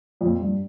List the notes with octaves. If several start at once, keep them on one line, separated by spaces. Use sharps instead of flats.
F2 A#2
G2